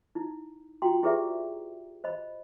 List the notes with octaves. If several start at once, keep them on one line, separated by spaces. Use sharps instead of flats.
D#4 E4
F4 F#4 G5 A#5 C6
E4 G4 G#4 B4 D5 E5
C5 D#5 B5